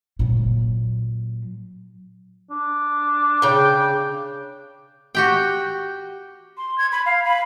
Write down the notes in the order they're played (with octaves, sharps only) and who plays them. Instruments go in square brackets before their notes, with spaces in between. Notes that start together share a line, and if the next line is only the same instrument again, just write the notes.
[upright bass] A#2 F#3
[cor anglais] D4
[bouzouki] C#3 G5
[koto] F#4 G4 G5
[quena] C6
G#6
B5
F5
B5